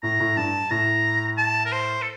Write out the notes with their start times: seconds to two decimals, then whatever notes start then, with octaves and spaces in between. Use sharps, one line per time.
0.03 A2 A#5
0.20 A2
0.36 G2 A5
0.70 A2 A#5
1.37 A5
1.65 A#4
1.72 C5
2.02 A4